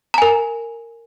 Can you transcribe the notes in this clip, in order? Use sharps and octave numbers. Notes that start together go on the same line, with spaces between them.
A#4 G#5 A#5